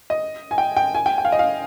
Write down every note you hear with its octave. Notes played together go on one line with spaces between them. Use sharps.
D#5
G#5
G5
G5
G#5
G5
G5
F5
D#5
F5